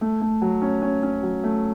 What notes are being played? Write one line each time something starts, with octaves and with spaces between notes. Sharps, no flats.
A3
A3
F#3
C#4
C#4
C#4
F#3
A3